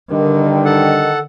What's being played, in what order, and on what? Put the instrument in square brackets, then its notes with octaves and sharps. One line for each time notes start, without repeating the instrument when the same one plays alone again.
[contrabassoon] G2 [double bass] D3 [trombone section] D#3
[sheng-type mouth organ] A4 F#5